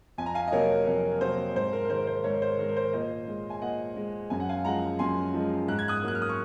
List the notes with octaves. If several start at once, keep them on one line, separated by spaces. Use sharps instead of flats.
F2 G#5
A#5
F5 G#5
D#5
C3 F#3 A#3 A#4 C#5
F2 A#4
C3 F#3 A#3 C5
G#2 C5
A#4
A#4
D#3 G#3 C5
C5
G#2 A#4 C#5
C5
D#3 G#3 A#4
A#4
C5
A#2 C5 D#5
G#3
G#5
A#2 D#5 F#5
G#3
F#2 G#5
F#5
F5 G#5
F3 G#3 F#5 A#5
F#2 G#5 C6
F3 G#3
G#2 F#6
G#6
D#6 F#6
F#3 A#3 F#6
F6
D#6
C#6